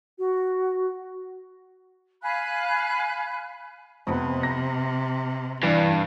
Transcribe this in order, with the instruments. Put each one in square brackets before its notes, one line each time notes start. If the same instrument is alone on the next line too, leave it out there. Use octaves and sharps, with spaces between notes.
[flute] F#4
[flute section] F5 G#5 B5 F#6
[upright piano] F2 B3 [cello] C3
[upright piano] A#6
[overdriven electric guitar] G2 [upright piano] E3 D4